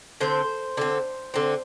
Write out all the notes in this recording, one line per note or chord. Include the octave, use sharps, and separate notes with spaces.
D3 C4 C5
D3 C4
D3 C4